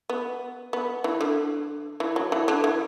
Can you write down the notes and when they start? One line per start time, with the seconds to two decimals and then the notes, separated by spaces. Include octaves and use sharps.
0.09 B3
0.73 B3
1.04 E3
1.21 D3
2.00 E3
2.16 F#3
2.32 E3
2.48 D3
2.64 E3